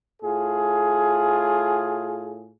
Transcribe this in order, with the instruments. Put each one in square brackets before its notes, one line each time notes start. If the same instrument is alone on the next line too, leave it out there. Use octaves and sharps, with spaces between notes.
[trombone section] A2 F4 G#4